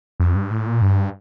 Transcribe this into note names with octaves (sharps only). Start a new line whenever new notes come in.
F2
G2
A2
A#2
G2